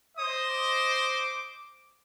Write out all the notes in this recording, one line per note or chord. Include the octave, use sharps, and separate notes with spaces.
C5 D#5 D#6
D6